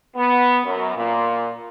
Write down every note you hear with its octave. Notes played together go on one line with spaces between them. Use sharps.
B3
F#2
A#2